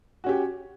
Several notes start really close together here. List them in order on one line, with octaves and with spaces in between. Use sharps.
F#4 C#4 G4